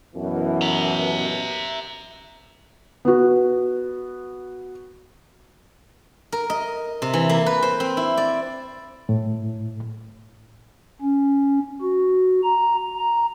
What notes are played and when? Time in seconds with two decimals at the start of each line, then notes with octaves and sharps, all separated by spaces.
0.15 F#2 B2 E3
0.62 E5 A#5
3.05 B3 F#4
6.32 A#4
6.50 D#5
7.02 C3
7.14 E3
7.29 A#3
7.46 B4
7.63 C5
7.80 C4
7.97 E4
8.17 D5
9.09 A2
11.01 C#4
11.82 F#4
12.43 A#5
12.98 A#5